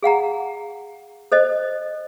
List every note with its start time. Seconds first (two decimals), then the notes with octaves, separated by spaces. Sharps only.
0.03 G#4 F5 F#5 A#5
1.32 A4 C5 D#5